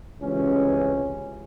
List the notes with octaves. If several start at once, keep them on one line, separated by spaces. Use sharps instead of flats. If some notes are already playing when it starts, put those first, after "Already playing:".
C#2 C3 E3 C#4